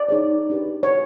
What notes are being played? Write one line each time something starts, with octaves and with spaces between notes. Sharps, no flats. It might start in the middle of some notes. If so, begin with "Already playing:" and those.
Already playing: D5
D#4 G#4 C#5
D4 G4 B4
C#5